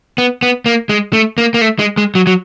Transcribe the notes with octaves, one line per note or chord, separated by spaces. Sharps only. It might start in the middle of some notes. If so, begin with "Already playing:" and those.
B3
B3
A#3
G#3
A3
A#3
A#3
A3
G#3
G#3
F#3
F#3